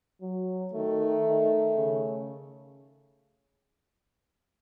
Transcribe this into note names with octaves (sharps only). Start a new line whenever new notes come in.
F#3
D#3 A3
D#3
C#3